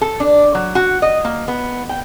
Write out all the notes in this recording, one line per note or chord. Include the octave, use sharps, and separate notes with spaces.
A4
D4
F#3
F#4
D#5
A#3
B3
G5